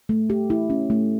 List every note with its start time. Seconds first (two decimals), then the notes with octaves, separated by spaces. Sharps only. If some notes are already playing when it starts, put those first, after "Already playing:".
0.09 A3
0.30 G4
0.50 E4
0.70 C#4
0.90 A3